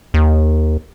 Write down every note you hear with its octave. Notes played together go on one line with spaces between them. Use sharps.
D#2